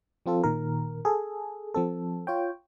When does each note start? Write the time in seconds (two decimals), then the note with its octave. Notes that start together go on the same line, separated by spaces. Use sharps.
0.26 F3 C4 F4 A4
0.44 A#2 D#3 A#4
1.05 G#4 A4
1.74 F3 C4 A4
2.27 F4 C#5 G5